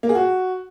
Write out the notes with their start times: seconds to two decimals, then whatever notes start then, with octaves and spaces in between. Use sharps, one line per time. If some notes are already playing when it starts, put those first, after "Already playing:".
0.03 A#3
0.09 G#4
0.15 F#4